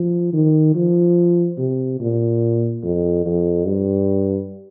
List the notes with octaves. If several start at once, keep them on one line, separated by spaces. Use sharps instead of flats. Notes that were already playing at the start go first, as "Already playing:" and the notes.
Already playing: F3
D#3
F3
C3
A#2
F2
F2
G2